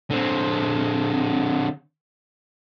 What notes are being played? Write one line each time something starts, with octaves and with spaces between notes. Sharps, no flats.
D3 C4